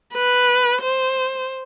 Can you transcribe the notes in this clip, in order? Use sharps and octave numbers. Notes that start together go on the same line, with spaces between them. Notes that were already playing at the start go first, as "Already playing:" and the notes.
B4
C5